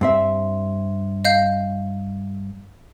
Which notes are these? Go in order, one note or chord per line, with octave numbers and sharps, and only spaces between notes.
G2 C4 E5
D#5 F5 G6